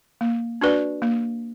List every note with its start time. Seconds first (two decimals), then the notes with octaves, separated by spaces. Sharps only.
0.21 A#3
0.61 D4 F#4 B4 D5
1.02 A#3